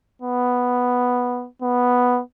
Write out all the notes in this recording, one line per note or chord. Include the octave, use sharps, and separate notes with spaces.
B3
B3